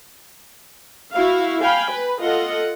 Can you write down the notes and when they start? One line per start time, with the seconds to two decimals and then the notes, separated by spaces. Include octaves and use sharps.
1.13 E4 F#4 F5
1.61 F5 G5 G#5 B5
1.91 B4
2.21 F4 A4 D#5 F#5